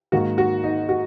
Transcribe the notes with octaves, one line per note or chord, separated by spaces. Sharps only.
G#2 D#3 A#3 F#4
F#4
D#4
F#4